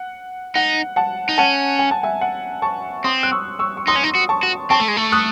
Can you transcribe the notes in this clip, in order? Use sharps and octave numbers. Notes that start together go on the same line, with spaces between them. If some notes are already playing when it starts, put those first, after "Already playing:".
Already playing: F#5
D#4 F#5
F#5 A5
D#4
C#4 F#5 A5
G#5
A5
E5 G#5
F#5
A5 C#6
C4 C6 D#6
F#6
C#6 E6
C#6 E6
C#6
D#4 C6 D#6
C#4
D#4
F#4
A5 C#6
F#4
C4 A5 C#6
A3
G#3
A3
D#6 F#6